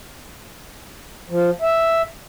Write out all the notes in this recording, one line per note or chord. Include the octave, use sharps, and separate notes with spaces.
F3
E5